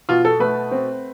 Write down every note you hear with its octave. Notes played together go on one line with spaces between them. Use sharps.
B2 F4
A4
A3 B4
C4